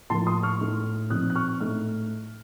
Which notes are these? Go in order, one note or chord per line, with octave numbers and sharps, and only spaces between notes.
A2 F3 A#3 F4 A5 C6
C6 D#6
C#6 F6
A2 A3 D#4
A#2 F3 C4 D#4 D#6 F#6
F#6
C#6 F6
A2 A3 D#4 F6